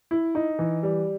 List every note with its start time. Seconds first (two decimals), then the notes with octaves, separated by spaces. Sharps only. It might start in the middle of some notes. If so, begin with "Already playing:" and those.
0.11 E4
0.35 D#4
0.59 E3
0.83 G3